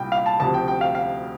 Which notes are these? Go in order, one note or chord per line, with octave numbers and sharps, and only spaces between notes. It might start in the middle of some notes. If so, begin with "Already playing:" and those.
Already playing: C2 A#2 G5
F5
A5
D2 C3 F3 A5
G5
G5
F5
F5